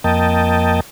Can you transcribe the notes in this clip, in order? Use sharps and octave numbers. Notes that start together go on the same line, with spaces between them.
F2 A#3 D#5 G5 A5